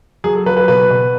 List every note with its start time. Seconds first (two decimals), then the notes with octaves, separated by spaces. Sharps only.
0.24 F#3 G#4
0.35 A4
0.46 F#3 B4
0.57 B4
0.68 B2 B4
0.90 B2